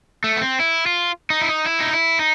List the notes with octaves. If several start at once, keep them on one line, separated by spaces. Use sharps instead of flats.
A3
B3
C4
E4
F4
D#4
E4
D#4
E4
D#4
E4
D#4